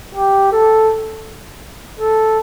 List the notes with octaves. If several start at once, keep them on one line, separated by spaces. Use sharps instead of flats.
G4
A4
A4